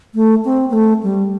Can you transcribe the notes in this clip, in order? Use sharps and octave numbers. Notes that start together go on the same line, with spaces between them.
A3
C4
B3
A3
G3